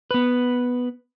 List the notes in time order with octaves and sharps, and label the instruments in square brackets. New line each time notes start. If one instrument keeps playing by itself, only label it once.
[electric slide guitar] B3 B4